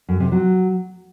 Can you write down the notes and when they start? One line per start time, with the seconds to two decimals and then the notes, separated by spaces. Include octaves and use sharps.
0.09 F#2
0.20 C3
0.32 F#3